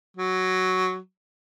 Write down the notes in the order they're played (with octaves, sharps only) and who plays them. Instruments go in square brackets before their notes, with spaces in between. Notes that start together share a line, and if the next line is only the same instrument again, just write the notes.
[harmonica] F#3